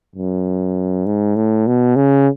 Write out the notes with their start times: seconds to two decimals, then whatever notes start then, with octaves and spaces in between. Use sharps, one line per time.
0.15 F#2
1.06 G#2
1.36 A2
1.67 B2
1.96 C#3